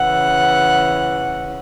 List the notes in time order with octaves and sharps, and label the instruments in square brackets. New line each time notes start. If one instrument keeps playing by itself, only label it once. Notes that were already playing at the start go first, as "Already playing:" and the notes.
Already playing: [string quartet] C#3 E3 F#5